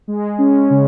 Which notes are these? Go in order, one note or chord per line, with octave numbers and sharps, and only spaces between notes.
G#3
C#4
C#3